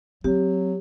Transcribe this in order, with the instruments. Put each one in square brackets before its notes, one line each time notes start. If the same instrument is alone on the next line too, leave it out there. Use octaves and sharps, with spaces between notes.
[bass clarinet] F#3 [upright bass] C4 [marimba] G4